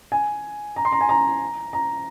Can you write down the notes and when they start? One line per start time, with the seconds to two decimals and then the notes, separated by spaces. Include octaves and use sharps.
0.12 G#5
0.76 A#5
0.85 C6
0.92 A#5
1.01 G#5
1.09 A#5
1.73 A#5